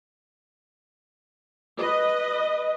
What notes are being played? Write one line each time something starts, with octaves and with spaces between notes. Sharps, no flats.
B4 D#5